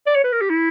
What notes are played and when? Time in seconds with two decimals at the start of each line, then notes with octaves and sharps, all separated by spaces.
0.07 D5
0.16 C#5
0.24 B4
0.33 A#4
0.41 G4
0.50 E4